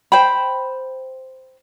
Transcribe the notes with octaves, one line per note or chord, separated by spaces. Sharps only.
C5 G5 B5